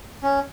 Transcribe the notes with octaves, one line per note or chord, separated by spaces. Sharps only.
C#4